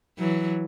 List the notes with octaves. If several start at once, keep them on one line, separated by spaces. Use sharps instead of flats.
E3 F#3